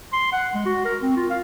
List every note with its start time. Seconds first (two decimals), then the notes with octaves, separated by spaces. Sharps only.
0.12 C6
0.32 F#5
0.54 G#3
0.65 F#4
0.85 A#4
1.02 C4
1.17 F4
1.30 F5